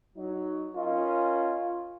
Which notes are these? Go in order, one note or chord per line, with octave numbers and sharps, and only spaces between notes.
F#3 D#4
C#4 F4 A#4 D#5